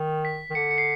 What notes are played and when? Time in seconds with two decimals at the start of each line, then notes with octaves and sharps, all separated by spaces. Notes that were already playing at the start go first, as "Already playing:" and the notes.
Already playing: D#3
0.25 B6
0.50 D#3
0.55 D3 C#7
0.71 C#7
0.78 C7